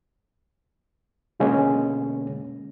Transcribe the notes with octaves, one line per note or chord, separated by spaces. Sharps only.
B2 D3 G#3 A#3 C#4